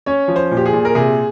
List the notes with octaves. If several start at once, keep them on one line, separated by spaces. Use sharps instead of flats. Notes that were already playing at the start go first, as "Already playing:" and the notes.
C#4 C#5
F3
C5
A#2
G4
G#4
A#2
A#4
C3 G#4